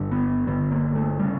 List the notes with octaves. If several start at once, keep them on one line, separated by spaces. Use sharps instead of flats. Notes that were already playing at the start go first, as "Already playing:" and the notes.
Already playing: G1 G2 D3
B3
G1 G2 D3 B3
A#3
A3
C#3 G3